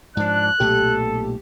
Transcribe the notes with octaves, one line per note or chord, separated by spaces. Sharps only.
G#2 F3 D4 F#6
B1 A#2 A3 G4 A4